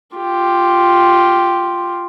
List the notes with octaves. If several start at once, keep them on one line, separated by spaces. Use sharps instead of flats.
F4 G4